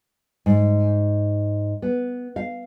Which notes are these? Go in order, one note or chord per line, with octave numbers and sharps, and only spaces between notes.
G#2
B3
F5